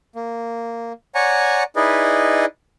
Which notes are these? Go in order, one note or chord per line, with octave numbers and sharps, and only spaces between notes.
A#3
C#5 D5 F#5 G#5 A#5 C#6
D#4 E4 G#4 B4 D5 D#5